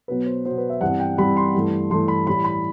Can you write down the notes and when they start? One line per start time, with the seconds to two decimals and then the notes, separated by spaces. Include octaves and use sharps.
0.08 B2 F#3 B3 B4
0.26 C5
0.45 B2 F#3 B3 C5
0.58 B4
0.70 E5
0.81 G2 E3 G3 C4 F#5
1.00 G5
1.17 G2 E3 G3 C4 B5
1.37 C6
1.55 G2 E3 A3
1.90 G2 E3 A3 C6
2.08 B5
2.26 A2 E3 G3 B5
2.45 B5